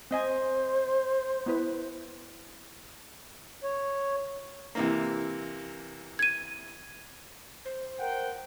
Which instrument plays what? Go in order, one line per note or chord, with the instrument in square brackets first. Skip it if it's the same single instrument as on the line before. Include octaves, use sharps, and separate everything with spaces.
[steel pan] C4 D#5 G#5 [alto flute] C5
[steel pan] B3 E4 B4
[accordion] C#5
[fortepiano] C3 E3 A#3
[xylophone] G#6 D#7
[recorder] C5
[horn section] A#4 F#5 G5